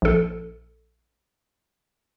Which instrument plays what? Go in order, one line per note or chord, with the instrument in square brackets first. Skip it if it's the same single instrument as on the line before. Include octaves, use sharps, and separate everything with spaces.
[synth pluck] A#1 A4